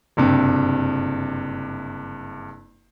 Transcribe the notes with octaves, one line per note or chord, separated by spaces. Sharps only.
F#1 G2 C3